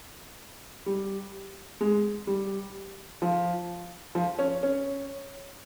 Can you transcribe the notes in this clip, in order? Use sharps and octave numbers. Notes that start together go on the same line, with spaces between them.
G3
G#3
G3
F3
F3
C#4
C#4